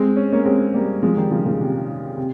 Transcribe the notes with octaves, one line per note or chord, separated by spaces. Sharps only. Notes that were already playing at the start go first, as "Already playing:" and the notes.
Already playing: G#3 C4
C#4
A#3 C#4
G#3 C4
G3 A#3
F3 G#3
D#3 G3
C#3 F3
A#2 C#3
C3 D#3
C3